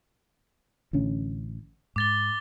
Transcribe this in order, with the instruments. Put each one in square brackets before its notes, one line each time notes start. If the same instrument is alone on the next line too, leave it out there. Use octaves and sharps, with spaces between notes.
[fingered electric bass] A1 D3 C#4
[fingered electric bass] G#2 [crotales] D6 A6 G7